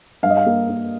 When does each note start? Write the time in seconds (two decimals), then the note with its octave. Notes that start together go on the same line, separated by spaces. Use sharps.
0.23 G2 F5
0.30 D#5
0.37 F5
0.46 A#3
0.70 A#3